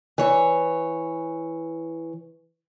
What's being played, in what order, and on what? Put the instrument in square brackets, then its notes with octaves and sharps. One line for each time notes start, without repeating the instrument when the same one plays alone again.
[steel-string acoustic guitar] E3 C#5